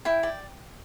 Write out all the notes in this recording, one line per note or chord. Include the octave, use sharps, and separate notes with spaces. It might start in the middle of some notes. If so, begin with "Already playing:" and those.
E4 G5
D5 G5